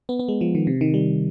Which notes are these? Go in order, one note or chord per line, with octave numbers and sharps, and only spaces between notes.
B3
B3
G#3
F3
D#3
C3
D#3
G3